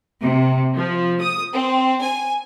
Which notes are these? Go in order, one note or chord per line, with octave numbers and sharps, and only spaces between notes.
C3
F3
D#6
C4
G#5